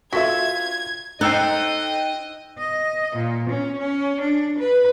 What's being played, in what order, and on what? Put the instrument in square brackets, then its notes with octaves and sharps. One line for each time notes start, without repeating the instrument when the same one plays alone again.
[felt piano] F4 B6 [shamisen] F#4 A4 E5 [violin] G#6
[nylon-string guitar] D#4 [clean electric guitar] A4 C5 [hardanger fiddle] D#5 [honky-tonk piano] G5 E6 F#6
[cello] D#5
A#2
C#4
C#4
D4
B4